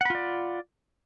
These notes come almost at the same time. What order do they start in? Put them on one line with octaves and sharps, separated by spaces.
F#5 B5 F4 D5